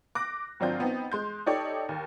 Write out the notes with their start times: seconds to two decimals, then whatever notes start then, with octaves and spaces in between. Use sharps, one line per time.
0.15 D6 F#6 A#6
0.60 G#1 F#3 C4 D4 F4 G6
0.80 B3 C4 D#4
1.12 G#3 C6 G6
1.46 D#4 G4 A4 C#5 D5
1.89 D#2